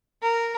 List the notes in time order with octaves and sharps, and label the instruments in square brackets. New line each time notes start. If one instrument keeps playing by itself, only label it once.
[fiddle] A#4